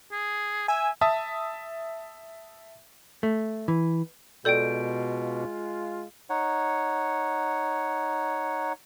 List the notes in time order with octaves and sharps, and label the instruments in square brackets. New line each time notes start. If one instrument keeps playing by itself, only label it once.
[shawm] G#4
[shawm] E5 [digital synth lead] G#5
[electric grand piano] E5 A5 D#6
[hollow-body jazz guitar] A3
E3
[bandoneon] B2 [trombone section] G#3 F4 [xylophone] A4 D5 G5 [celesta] G6 D7
[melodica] D#4 C#5 F#5